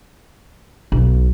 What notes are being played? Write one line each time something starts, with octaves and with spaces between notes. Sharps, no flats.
B1